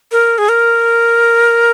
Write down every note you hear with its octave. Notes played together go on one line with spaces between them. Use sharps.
A#4
G#4
A#4